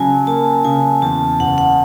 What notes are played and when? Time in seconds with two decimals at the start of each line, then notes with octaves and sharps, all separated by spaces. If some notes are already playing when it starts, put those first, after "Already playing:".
Already playing: C#3 F#3 G#5 A5
0.27 A#3 A5
0.65 C#3 G#5
1.02 E2 A5
1.40 F#1 F#5
1.58 F#5